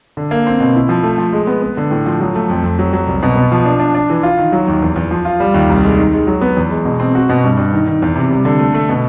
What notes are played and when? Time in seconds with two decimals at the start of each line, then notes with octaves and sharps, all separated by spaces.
0.17 D3
0.31 A#3
0.47 C4
0.60 B2
0.75 E4
0.89 F3
1.03 A3
1.18 F3
1.33 G#3
1.47 B3
1.62 B3
1.77 D3
1.91 A2
2.06 F3
2.20 F#3
2.35 A3
2.50 F2
2.64 F2
2.79 F#3
2.93 F#3
3.07 C2
3.23 B2
3.36 B3
3.52 F3
3.65 D4
3.80 D4
3.95 D4
4.10 E3
4.23 F4
4.38 D#3
4.52 F#3
4.68 D#2
4.82 E2
4.96 E2
5.11 F3
5.25 F4
5.40 G3
5.54 D#2
5.70 C2
5.84 G#3
5.98 D#3
6.13 G#3
6.27 F#3
6.41 B3
6.57 E2
6.71 G#3
6.85 B2
7.00 C4
7.15 F#4
7.29 B2
7.44 G2
7.57 G2
7.73 D#3
7.87 D#3
8.02 E2
8.16 C3
8.31 G3
8.45 D3
8.59 A3
8.74 A3
8.89 B2